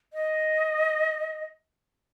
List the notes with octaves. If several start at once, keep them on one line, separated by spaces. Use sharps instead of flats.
D#5